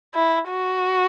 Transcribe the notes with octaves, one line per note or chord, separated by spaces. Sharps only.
E4
F#4